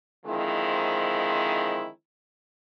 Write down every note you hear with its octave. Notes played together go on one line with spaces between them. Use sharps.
D3 D#3 F3 G#3 C4 E4